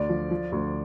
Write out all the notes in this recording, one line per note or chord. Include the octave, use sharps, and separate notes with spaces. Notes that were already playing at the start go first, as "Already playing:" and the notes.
Already playing: D2 D5
F3
F3
D2